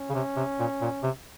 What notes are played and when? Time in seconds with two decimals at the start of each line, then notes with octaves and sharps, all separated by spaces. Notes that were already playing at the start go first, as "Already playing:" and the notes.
Already playing: C#4
0.10 C#3
0.15 C3
0.36 C3
0.59 A#2
0.81 A#2
1.03 C3